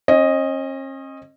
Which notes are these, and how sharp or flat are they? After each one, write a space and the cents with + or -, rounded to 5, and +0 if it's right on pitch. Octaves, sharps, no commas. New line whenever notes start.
C#4 -45 D#5 +0